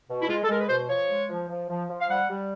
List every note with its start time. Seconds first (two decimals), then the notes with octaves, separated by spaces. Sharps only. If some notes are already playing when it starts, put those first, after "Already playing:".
0.09 B2
0.21 E4
0.28 G#3 F4
0.43 A4
0.49 G#3 A#4
0.60 B4
0.69 B2 C5
0.89 F3 C#5
1.08 G#3
1.29 F3
1.48 F3
1.69 F3
1.89 F3
2.00 F5
2.09 G3 F#5
2.29 G3